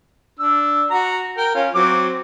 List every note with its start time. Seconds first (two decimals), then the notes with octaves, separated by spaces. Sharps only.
0.40 D4 E6
0.91 F#4 A#5
1.38 A#4 G5
1.55 C#4 F4
1.75 F#3 C4 D6